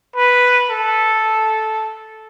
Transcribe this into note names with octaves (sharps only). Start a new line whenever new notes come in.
B4
A4